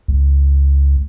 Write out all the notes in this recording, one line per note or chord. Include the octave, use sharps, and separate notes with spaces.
C#2